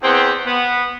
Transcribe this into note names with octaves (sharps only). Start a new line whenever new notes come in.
E2 B3 C4
B3